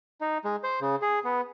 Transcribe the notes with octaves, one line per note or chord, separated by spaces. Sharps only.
D#4
G#3
C5
C#3
G#4
B3